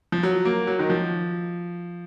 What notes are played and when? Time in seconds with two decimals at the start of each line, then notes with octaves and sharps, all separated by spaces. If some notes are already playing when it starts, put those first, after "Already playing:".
0.12 F3
0.23 F#3
0.45 A#3
0.67 F#3
0.79 D#3
0.90 F3